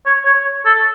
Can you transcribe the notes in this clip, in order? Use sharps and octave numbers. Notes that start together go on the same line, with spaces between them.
C#5
C#5
A4